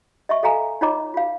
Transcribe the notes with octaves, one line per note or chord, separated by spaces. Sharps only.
D#5 E5 C#6
A4 D#5 F5 G#5 A#5
D#4 F4 C#5 D#5 A#5 D6
F4 F5